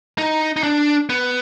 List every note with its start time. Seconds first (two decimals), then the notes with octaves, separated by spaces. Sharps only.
0.18 D#4
0.56 D#4
0.63 D4
1.10 B3